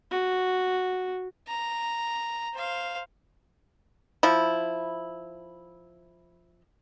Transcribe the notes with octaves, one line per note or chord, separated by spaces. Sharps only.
F#4
A#5
C5 F5
F3 E4